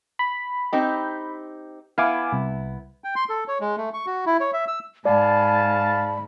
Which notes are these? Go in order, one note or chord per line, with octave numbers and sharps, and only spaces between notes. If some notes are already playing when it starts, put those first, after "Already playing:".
B5
C4 D#4 G4
B3 E4 F5 G#5 D6
C2
G5
C6
A4
C#5
G#3
A3
C#6
F#4
E4
C#5
E5
E6
G#2 D5 F5 G#5 A5 B5